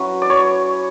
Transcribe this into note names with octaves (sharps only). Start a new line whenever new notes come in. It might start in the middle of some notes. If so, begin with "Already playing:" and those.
Already playing: F#3 C#4 E4 B4
D5
C#5